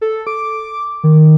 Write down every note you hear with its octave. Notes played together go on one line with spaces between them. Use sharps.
A4
D6
D#3